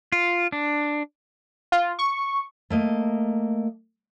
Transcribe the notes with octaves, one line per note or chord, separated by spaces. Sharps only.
F4
D4
F4
C#6
A3 A#3 D#5